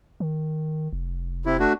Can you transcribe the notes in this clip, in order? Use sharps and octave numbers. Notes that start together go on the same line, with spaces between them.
D#3
F1
C3 E4
A3 D4 F#4